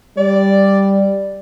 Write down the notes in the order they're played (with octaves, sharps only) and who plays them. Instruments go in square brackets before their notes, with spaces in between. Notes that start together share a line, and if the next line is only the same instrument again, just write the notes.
[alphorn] G3 [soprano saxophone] D5